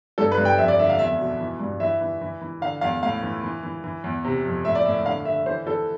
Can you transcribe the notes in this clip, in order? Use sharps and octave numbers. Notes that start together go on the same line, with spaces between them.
G2 A4
B4
G2
G5
F2 E5
D5
D3 E5
F5
E2 E5
B2
E3
G2
E3 E5
E3
E3
E3
D3 F5
E2 F5
A2 F5
E3
E3
E3
E3
E2
C3
F2
A2 E5
D5
A2 E5
D3 F5
D3 E5
E3 C5
E3 A4